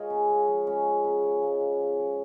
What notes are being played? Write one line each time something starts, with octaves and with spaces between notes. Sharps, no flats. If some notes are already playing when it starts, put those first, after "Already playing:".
Already playing: G#3 F4 G#4 A#4 C#5 D#5
C#3
C#3
F3
G#3 C#4
C#3
C#3
F3
G#3
C#3
C#3
F3